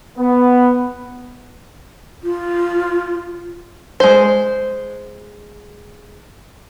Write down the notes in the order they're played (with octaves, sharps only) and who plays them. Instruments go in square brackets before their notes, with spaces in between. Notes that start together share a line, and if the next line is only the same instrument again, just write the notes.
[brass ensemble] B3
[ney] F4
[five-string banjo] G#3 C5